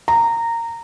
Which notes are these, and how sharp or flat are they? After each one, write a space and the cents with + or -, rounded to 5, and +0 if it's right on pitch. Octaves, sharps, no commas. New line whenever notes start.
A#5 -15